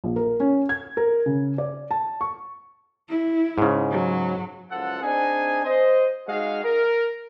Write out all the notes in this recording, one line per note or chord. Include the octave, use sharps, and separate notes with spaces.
A#1
A#4
C#4
G#6
A#4
C#3
D5
A5
C#6
E4
G#2 C#3
F#3
F#1 C#2 F3 A4 F#5
C4 D4 D#4 G#4 D#5 G#5
C5 D#5
G#3 D#4 F#4 G#4 D#5 F5
A#4